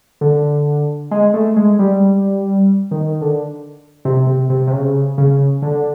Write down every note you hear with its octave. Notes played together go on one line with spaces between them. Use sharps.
D3
G#3
A3
G#3
G3
D#3
D3
C3
C3
C3
C3
C#3
C#3
D3